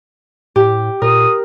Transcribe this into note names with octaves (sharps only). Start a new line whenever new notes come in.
A2 G4
A#2 A#4 D#6